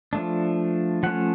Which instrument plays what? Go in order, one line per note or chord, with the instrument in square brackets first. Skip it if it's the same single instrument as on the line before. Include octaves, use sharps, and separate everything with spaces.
[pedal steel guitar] F3 A3 D4
F3 A3 C#4 F#5